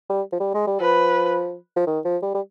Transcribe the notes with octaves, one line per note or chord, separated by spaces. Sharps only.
G3
F3
G3
G#3
G3
F3 B4
F3
D#3
F3
G3
G3